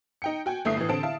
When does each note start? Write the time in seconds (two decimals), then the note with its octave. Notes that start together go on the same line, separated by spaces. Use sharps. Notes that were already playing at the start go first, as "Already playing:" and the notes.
0.22 D#4 G5 C#7
0.46 F#4 G5 G#5
0.65 G1 A3 E4 D#6 C7
0.77 A2 E3
0.89 D3 C4 A5 D7
1.03 E4 F5 A5